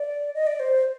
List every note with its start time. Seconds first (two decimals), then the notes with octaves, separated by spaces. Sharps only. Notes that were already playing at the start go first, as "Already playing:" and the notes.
Already playing: D5
0.35 D#5
0.47 D5
0.60 C5